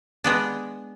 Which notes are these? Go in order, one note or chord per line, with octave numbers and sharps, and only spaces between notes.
G#3 B3 D4